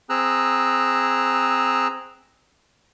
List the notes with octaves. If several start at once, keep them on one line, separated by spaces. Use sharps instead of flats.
C4 G#4 A#5 E6 F#6